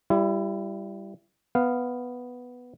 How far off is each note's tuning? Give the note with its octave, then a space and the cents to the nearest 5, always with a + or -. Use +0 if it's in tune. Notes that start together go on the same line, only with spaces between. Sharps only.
G3 +0 E4 +30
B3 +0 F5 +0